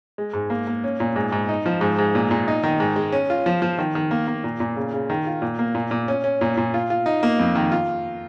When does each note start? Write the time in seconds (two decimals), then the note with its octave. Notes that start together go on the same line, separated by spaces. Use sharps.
0.18 G#3
0.34 G#2
0.50 A#3
0.67 A#3
0.84 C#4
1.00 A#2
1.16 G#2
1.32 G#2
1.49 D#4
1.66 F3
1.81 G#2
1.98 G#2
2.15 A#2
2.31 A#2
2.48 D#4
2.64 D#3
2.80 G#2
2.96 G#3
3.12 C#4
3.30 F4
3.46 F3
3.62 F3
3.79 D#3
3.95 D#3
4.11 A#3
4.27 A#3
4.44 A#2
4.60 A#2
4.76 C#3
4.93 C#3
5.10 D#3
5.27 F4
5.42 A#2
5.59 A#3
5.75 A#2
5.91 A#2
6.08 C#4
6.24 C#4
6.41 A#2
6.57 A#2
6.74 F4
6.90 F4
7.06 D#4
7.23 A#3
7.39 F2
7.55 D#3
7.72 F4